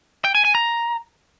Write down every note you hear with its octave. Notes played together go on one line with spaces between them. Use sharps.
G5
G#5
G#5
A#5